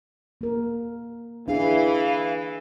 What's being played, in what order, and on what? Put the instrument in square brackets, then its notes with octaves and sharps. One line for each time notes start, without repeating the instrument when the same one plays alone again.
[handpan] A#3 A#4
[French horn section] E3 [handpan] D4 G#4 [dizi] F5